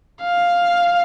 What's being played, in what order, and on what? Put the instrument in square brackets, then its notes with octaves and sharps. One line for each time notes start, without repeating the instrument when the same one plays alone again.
[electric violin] F5